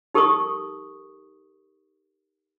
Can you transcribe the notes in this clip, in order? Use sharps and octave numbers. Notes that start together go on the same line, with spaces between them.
D#4 G4 A4 A#4 C#6 D#6